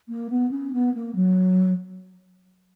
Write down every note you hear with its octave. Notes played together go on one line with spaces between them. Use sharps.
A#3
B3
C#4
B3
A#3
F#3